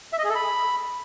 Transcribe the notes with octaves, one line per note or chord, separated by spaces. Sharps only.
E5
D#5
G#4
A4
B5